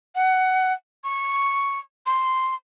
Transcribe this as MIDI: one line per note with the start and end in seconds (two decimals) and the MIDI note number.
0.15 0.73 78
1.04 1.79 85
2.06 2.54 84